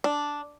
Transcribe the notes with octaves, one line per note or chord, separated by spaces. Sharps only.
D4